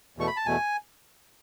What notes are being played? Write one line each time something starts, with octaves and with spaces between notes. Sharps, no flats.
E2 B2 A3 C#6
B5
A5
E2 B2 A3 G#5